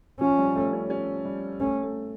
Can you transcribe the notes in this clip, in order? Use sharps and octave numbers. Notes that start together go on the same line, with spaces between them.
F3 C#4
G3
A3
C#4
C#4
G3
A3 C#4
A3